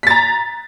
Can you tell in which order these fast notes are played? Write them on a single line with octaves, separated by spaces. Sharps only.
B6 A6 A#5